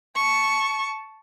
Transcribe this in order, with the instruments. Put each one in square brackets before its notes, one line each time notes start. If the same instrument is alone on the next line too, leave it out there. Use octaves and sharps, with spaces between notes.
[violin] A5 C#6